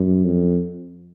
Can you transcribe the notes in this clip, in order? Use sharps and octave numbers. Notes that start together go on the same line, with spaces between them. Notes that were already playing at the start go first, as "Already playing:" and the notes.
Already playing: F#2
F2